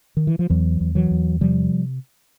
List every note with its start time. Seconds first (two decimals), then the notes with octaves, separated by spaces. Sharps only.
0.17 D#3
0.27 E3
0.39 F3
0.50 E2 E3 F#3
0.81 E2
0.95 E3 F#3
1.11 E2
1.41 C3 F3 G3